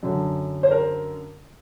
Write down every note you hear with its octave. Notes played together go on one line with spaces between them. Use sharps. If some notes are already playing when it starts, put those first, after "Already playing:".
F#2 D3
C5
A#4